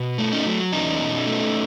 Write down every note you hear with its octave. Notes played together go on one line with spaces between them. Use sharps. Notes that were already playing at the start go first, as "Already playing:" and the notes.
Already playing: B2
A3
C#4 D#4
F#3
E2 C#4 D#4
B2
A3